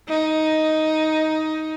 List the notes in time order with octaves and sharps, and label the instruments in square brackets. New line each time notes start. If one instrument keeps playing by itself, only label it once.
[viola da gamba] D#4